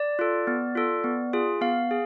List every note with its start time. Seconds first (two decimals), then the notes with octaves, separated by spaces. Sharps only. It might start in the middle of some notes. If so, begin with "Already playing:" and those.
Already playing: D5
0.19 F4 A4
0.47 B3
0.75 F4 A4
1.04 B3
1.33 F4 G#4
1.61 B3 F5
1.91 G#4